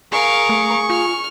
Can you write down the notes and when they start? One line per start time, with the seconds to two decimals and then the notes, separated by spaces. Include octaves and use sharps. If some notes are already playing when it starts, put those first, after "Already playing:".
0.12 G#4 A#4 F5 C#6
0.49 A3
0.90 F4 F6